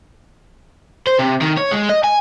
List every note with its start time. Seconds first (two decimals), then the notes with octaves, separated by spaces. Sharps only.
1.07 C5
1.19 C3
1.42 D#3
1.57 C#5
1.71 G#3
1.90 D#5
2.04 G#5